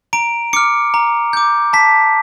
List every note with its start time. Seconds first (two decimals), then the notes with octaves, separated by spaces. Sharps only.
0.13 A#5 D7
0.53 D6 F6 C#7
0.94 A#5
1.33 D6 G6
1.73 A5 B6